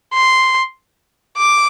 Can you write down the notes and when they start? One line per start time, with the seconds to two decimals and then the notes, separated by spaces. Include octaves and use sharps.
0.14 C6
1.37 D6